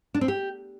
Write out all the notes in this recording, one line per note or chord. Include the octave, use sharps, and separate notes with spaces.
D4
C4
G4